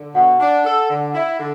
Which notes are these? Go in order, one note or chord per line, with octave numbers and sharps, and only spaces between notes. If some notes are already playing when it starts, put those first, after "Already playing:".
Already playing: D3
B2 F#5
D4
A4
D3
E4
D3